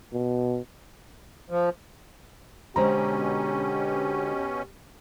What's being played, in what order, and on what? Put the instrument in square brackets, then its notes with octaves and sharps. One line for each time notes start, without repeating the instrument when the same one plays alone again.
[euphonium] B2
[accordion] F3
[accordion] B2 C#4 [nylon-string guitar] D3 G#3 [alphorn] G4 [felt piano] C5 A#5